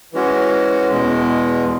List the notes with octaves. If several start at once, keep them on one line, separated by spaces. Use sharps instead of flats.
E3 G#3 C#4 F#4
E2 B2 G#3